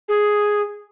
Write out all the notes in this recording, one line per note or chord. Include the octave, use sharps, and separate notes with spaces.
G#4